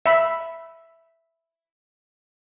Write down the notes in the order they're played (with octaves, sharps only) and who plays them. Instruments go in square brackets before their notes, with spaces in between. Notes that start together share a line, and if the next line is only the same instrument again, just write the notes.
[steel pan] E5 B5